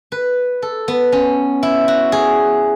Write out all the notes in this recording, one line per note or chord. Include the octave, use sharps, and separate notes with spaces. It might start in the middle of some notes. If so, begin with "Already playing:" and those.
B4
A4
B3
C#4
E4
F#4
G#4